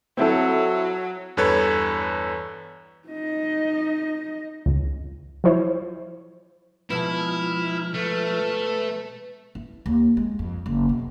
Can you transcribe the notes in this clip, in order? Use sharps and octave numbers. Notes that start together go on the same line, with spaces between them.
F#3 C4 E4 A4
E2 G2 A4 B4 C#5 G#6
D#4 D#5
C#2
F3 F#3 E4 C5 C#5
B2 F3 G#3 E4 A5 F6
A3 B4
E4
D#2
G#3
F2
F#1
B2